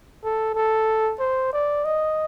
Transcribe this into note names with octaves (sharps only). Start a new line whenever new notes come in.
A4
A4
C5
D5
D#5